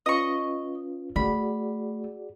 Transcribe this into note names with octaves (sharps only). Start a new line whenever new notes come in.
C#4 F4 B4 D#5 C#6
A3 F#4 G#4 D5 B5